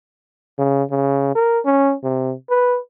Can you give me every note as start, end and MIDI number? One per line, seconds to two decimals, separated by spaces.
0.59 0.83 49
0.91 1.32 49
1.35 1.59 70
1.65 1.94 61
2.04 2.34 48
2.50 2.78 71